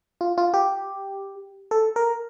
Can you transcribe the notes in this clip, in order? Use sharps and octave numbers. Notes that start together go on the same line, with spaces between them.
F4
F4
G4
A4
A#4